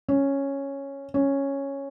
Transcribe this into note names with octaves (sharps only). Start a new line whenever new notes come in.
C#4
C#4